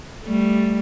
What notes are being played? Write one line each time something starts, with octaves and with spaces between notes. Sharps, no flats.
G3 A3